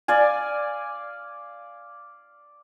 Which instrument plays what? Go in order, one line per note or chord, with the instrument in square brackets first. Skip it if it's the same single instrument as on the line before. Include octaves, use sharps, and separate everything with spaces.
[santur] D5 F5 G#5